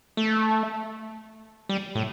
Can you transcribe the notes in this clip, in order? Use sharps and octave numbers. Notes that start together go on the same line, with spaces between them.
A3
G3
A2